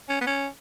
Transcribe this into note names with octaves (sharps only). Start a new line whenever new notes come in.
C#4
B3
C#4